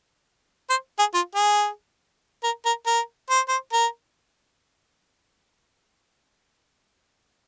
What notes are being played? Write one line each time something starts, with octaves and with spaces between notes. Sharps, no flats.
C5
G#4
F4
G#4
A#4
A#4
A#4
C5
C5
A#4